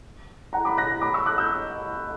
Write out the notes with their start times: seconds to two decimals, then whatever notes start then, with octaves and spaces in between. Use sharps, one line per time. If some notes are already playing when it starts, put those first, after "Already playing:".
0.53 F#5 A#5
0.65 B5 D6
0.77 F#6 A#6
1.01 B5 D6
1.14 C#6 E6
1.26 D6 F#6
1.38 E6 G6